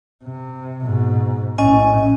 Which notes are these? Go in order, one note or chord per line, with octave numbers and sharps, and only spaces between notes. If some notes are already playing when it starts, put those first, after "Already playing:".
C3
G#2 B2
A#1 A2 C#4 D#5 G#5